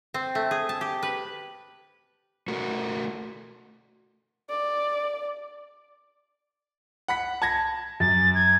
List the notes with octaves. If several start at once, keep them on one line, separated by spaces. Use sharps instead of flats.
C4
A3
G#4
A5
G4
B4
A3 F#4 A#4
D5
F#5 B5 B6
A5 G#6 A#6
F#2 A6
G#6